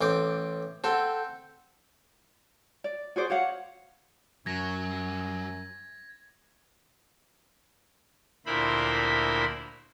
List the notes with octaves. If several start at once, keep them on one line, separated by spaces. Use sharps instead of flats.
A1 C4 D6
C4 A4 F#5 G5
D5
F#4 G#4 C5 D5
F#4 C#5 F5 F#5
F#2 F#3 G#6 A#6
D2 A#2 E4 A#4 C5 B5